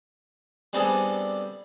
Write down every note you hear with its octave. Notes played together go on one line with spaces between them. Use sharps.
G3 B3 C4 D4 G#4 A4